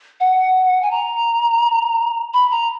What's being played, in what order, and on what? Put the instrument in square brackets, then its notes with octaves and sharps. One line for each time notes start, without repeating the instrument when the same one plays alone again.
[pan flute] F#5
G#5
A#5
B5
A#5